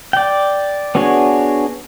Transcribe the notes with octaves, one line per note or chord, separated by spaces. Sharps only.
D5 G5
B3 D4 F#4 G#4 C#5